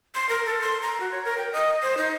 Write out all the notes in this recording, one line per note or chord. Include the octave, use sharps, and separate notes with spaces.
C6
A#4
A4
C6
A#5
F#4
C#5
A#4
G5
D#5
C5
D#4